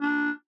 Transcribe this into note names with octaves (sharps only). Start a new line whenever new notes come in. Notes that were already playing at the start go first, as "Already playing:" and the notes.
D4